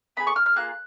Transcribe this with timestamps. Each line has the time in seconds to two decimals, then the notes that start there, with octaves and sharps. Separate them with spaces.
0.17 B3 D#4 G#4 B5
0.27 C#6
0.36 F6
0.46 F6
0.56 A#3 F4 G#4 F#6